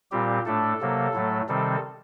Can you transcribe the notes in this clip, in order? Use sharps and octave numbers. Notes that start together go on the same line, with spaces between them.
A#2 G3 C4 G4
A2 A3 D4 A4
C3 F#3 A#3
A2 F#3 A3
C3 D#3 G3 C4 A4